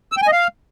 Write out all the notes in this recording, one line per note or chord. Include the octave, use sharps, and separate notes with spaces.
E6
G5
G#5
D#5
F5